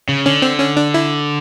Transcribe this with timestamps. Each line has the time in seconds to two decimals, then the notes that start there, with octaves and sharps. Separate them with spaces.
0.09 C#3
0.26 D3 C#4
0.42 C4
0.60 C#4
0.77 D4
0.94 E4